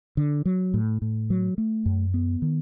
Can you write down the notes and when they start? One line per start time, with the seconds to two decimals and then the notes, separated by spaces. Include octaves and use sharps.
0.17 D3
0.45 F#3
0.74 A2
1.02 A2
1.30 F#3
1.58 A3
1.86 F#2
2.14 B3
2.42 D#3